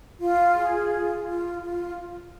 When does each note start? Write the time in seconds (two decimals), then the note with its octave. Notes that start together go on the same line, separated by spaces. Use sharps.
0.20 F4
0.56 G#4
0.91 F4
1.25 F4
1.61 F4